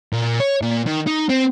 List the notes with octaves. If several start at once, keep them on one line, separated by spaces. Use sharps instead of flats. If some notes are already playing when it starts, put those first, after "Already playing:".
A#2
C#5
A#2
D#3
D#4
C4